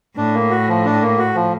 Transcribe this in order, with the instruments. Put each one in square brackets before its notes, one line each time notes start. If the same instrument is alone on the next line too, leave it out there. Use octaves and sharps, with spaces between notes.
[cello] A2 [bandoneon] D4
[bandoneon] A#3
F#4
F3
D4
A#3
F#4
F3